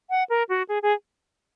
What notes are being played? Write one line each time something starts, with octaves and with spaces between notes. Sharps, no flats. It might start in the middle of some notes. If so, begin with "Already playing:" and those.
F#5
A#4
F#4
G#4
G#4